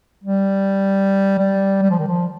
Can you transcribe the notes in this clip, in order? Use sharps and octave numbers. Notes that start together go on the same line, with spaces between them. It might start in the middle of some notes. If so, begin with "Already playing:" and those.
G3
G3
G3
F3
D#3
F3